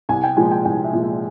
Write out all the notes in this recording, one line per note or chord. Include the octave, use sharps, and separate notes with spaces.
C2 G#5
G5
A#2 F3 G#3 G#5
G5
C2 G5
E5
A#2 F3 G#3
E5